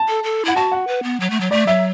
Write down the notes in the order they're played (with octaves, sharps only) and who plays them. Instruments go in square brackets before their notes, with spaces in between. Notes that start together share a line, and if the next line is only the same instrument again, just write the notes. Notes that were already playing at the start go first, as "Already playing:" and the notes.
Already playing: [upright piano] A5
[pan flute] A4
A4
[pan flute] E4 [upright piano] F#5
[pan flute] F#4 [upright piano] A5
[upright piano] F#5
[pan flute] B4
B3
F#3
A3
F#3
[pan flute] A3 [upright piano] D5
[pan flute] F#3 [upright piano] E5